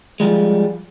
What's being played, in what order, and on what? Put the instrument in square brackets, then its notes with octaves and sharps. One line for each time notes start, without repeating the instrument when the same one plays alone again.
[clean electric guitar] F3 G3 G#3